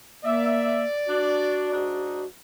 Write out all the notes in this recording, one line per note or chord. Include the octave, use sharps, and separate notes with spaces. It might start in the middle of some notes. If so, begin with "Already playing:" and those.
A#3 D5 E5
D4 F#4
G#2 D4 D#4